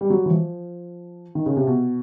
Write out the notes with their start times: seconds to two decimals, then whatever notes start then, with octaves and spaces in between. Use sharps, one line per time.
0.01 G3
0.10 F#3
0.26 E3
0.31 F3
1.35 D#3
1.46 C#3
1.57 C3
1.67 B2